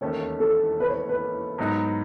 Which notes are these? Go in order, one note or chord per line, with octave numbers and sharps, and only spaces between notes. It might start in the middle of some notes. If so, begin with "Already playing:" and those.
E1 D#2 D#3 A3 C#4 C#5
A4
B4
C#5
B4
G#2 F#3 B3 D#4